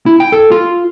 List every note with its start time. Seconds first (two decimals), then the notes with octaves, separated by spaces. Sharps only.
0.06 E4
0.20 G5
0.32 A4
0.51 F4